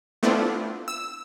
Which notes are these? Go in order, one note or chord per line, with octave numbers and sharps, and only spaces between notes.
A3 B3 C4 D4 E4 F4
E6